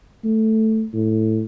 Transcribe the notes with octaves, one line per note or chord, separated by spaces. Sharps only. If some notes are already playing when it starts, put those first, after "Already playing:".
A3
A2